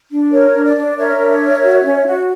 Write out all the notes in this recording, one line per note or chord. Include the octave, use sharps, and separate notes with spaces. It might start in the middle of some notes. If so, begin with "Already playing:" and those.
D4
A#4 C#5
D4
D5
D4
A#4 C#5 E5
D4
A#4
F#4
C#4
F#4